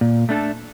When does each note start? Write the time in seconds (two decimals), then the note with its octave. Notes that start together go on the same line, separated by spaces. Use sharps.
0.01 A#2
0.29 A3 D4 A4